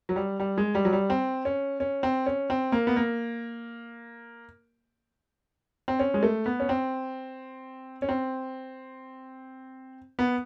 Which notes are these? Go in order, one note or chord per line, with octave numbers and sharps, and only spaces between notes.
F#3
G3
G3
G#3
G3
F#3
G3
C4
C#4
C#4
C4
C#4
C4
A#3
B3
A#3
C4
C#4
G#3
A3
B3
C#4
C4
C#4
C4
B3